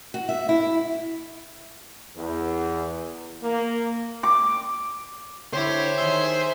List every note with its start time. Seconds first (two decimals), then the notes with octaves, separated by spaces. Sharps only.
0.14 F#4
0.29 E5
0.49 E4
2.17 E2
3.43 A#3
4.23 D6
5.53 D3 E4 G4 C5 C#5
5.98 D#3 G#4 E5 C6